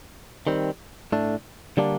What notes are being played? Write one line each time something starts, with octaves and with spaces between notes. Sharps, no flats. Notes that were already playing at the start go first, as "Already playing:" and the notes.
D#3 G3 C4
A2 A3 D4
D3 G3 A#3 D4